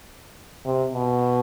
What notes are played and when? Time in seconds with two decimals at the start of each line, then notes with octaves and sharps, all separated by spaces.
0.65 C3
0.93 B2